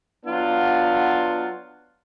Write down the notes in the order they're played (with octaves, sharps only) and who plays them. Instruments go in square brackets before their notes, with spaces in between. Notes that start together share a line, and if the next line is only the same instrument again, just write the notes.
[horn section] F#3 B3 D4 F4